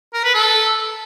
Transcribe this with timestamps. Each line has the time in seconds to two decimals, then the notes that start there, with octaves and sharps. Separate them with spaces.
0.14 A#4
0.24 B4
0.34 A4